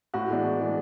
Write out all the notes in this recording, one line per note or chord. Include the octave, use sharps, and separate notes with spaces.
A2 F#4
E3 G#3 B3 D4
A2
E3 G#3 B3 D4